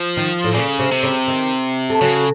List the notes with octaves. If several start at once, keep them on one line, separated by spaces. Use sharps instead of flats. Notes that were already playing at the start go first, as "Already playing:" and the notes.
Already playing: F3
D#3
A2
A#2 C#3
C3
C3
C#3
D#3
A3
C#3 F#3